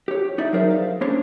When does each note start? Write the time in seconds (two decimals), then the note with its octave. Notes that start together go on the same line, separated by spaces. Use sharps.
0.08 G4 C#5
0.38 D#4 D5 E5
0.53 F#3 G#4 A#4 C5 E5
0.71 F5
1.01 A#3 C#4 D4 C5 C#5